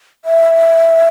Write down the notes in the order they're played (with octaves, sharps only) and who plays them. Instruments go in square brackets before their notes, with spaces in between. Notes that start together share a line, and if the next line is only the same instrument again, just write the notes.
[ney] E5